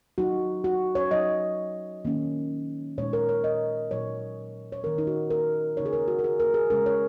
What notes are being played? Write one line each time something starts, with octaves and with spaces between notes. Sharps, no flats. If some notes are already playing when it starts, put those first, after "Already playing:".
F#3 D#4 F#4
F#4
C#5
F#3 D#4 D#5
D#3 A#3 C#4
A#2 G#3 D#4 C#5
A#4
C#5
D#5
A#2 F#3 D#4 C#5
C#5
D#3 A#3 C#4 A#4
D#4
F#4
A#4
C#3 A#3 D#4 C#5
G#4
A#4
F#4
A#4
G#4
A#4
G#4
C#3 G#3 C#4 A#4
C#5